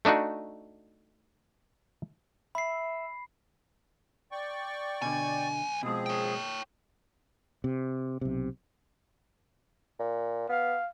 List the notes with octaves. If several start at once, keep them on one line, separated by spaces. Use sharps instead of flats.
A3 D4 D#4 F#4
E5 B5 C7
D5 G5 C#6
B1 B2 D3 G#5
B2 F3 G#3 C4 G#4
C#5 G5
C3
B1 C3
A#2
B3 F5